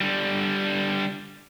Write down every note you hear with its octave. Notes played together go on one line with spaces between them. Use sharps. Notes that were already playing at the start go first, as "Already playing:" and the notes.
D3 G3